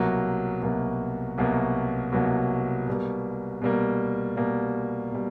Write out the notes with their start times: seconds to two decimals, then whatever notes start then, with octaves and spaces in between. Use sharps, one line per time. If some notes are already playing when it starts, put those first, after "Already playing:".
Already playing: C2 B2 F#3 A#3
0.62 C2 B2 F#3 A#3
1.38 C2 B2 F#3 A#3
2.12 C2 B2 F#3 A#3
2.87 B2 G3 A#3
3.62 B2 G3 A#3
4.37 B2 G3 A#3
5.12 B2 G3